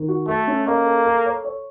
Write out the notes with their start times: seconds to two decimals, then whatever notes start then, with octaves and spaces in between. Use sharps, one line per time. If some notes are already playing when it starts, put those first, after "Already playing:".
Already playing: D#3
0.08 F#4
0.27 A3 A4
0.47 C#4
0.67 A#3 D#5
0.86 A4
1.06 A4
1.26 C#5
1.45 C#5